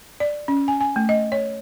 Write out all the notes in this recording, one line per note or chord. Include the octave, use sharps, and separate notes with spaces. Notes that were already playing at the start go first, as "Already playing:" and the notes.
D5
C#4
G#5
G#5
A3
D#5
C#5